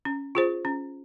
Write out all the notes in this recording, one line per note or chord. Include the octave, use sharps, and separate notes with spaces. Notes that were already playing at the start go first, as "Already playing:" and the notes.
C#4
F4 G#4 C5
C#4